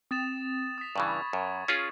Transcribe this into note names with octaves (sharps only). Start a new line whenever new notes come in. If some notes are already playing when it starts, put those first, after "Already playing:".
C4 D#6 A6 E7
D#6 B6
G2 C#3 E3 B5 C#6 G#6
F#2
C#4 F4 G#4